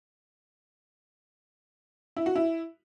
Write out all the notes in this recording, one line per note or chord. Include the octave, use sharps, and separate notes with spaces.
E4
F#4
E4